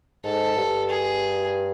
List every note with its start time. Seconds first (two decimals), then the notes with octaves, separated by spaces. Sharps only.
0.24 G#2 A4
0.56 G2
0.89 G#4